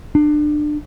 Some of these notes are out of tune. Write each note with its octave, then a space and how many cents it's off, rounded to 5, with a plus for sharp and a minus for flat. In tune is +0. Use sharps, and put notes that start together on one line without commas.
D4 +25